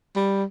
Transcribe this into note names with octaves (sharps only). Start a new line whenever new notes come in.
G3